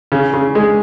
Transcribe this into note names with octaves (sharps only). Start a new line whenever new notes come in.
C#3
C#3
G#3